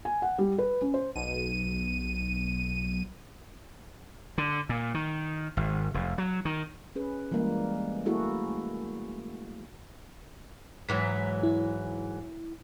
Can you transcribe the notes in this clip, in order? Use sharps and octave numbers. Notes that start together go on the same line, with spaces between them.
G#5
F#5
G3
B4
C#4
C5
B1 D#7
D3
A#2
D#3
G#1
F1
F#3
D#3
C#4 G#4 B4
E3 G3 G#3 A#3
A3 A#3 E4 F#4 G#4 A4
G#2 E3 F#3 B6
E4